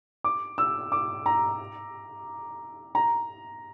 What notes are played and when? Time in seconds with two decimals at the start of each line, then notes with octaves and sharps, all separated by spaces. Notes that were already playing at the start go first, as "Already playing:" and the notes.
0.24 D6
0.58 E6
0.92 D6
1.26 A#5
2.95 A#5